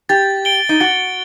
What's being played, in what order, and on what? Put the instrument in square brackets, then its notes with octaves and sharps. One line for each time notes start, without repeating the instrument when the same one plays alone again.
[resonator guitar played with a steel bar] G4 [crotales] A6
[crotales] D7 G7
[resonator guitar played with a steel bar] D#4
[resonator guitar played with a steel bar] F#4 [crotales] A6